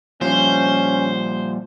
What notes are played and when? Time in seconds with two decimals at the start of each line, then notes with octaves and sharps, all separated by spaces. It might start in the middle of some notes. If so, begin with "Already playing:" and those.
0.21 A#2 F3 G3 C#4 C5